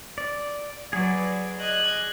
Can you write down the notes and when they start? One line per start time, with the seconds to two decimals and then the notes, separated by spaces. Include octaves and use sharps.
0.18 D5
0.93 F#3 G#4 B4 D5
1.59 D#5 F#6 G#6